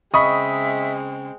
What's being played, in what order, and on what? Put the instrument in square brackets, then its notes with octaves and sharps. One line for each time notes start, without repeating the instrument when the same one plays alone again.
[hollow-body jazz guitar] C#3 B5 [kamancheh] G#3 C4 [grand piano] D#5 C#6 D#6 [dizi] E5